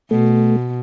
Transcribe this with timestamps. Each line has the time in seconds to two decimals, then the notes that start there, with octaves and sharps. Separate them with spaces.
0.11 B2 A3